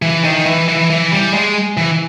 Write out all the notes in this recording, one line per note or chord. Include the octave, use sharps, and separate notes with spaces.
E3
D#3
E3
E3
E3
G3
G#3
E3